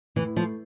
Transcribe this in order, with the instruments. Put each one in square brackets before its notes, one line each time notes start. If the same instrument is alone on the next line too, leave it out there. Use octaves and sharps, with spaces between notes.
[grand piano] A2 [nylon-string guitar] E3
[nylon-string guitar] F3 [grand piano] A3